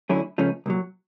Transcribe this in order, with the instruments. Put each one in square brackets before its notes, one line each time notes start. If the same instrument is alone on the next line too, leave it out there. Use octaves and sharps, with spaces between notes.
[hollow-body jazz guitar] D3 F#3 A3 C#4 E4
C#2 C#3 F3 A3 C#4
C2 A#2 F#3